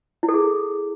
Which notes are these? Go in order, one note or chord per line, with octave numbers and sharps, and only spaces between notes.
E4
A4
G#4